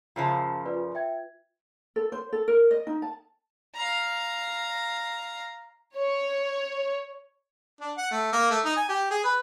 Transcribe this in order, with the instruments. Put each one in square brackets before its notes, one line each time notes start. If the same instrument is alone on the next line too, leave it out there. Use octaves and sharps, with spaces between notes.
[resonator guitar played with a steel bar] F#2 C#3 F3 [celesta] F4 C5 A5
[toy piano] F4 B4 [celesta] D5
[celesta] E5 G5 G#6
[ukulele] A4
C5
A4
A#4
D#5
D#4
A5
[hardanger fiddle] F5 A#5
[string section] C#5
[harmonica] D4
F#5
A3
A#3
A3
D#4
G#5
G4
G#4
B4